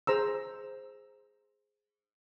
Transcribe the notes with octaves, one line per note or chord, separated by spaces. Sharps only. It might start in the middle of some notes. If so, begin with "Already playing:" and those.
G#4 C5 A#5 E6